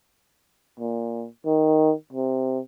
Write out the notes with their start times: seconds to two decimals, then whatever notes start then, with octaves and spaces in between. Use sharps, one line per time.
0.80 A#2
1.46 D#3
2.13 C3